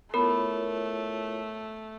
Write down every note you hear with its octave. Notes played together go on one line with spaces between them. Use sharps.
A3 B3 E4 F4 A#4 C#5 B5